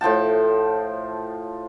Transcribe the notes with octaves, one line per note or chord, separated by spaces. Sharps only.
A2 F3 G5 A5